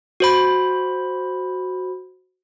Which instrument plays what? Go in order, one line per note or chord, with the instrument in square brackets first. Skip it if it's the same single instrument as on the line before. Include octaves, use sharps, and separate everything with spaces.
[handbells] F#4 C5 B5